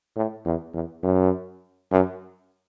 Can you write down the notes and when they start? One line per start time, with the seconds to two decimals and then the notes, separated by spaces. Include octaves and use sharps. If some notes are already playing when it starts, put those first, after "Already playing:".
0.16 A2
0.45 E2
0.73 E2
1.03 F#2
1.91 F#2